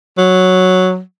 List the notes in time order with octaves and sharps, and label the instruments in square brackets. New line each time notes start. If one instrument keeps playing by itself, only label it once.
[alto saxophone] F#3